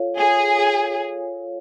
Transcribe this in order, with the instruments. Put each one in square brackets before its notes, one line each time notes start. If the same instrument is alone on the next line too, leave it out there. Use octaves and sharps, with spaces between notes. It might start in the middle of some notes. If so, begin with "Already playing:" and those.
Already playing: [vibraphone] F4 A4 C#5 F5
[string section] G#4